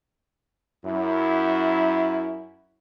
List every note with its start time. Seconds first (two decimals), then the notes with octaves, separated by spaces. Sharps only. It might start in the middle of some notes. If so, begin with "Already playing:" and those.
0.84 F#2 E4